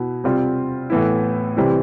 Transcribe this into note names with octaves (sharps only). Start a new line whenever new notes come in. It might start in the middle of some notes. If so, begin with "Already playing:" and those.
Already playing: B2 B3 E4
C3 G3 C4 F4
A2 E3 B3 E4
C3 E3 G3 C4 E4